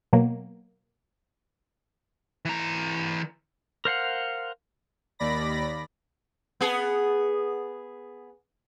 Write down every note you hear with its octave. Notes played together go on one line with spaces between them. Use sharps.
B2 F#3 A#3
E3 A#5
A#4 C5 F5 F#5
D#2 D5 B5 A#6
B3 G#4